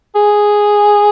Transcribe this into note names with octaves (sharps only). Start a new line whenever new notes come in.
G#4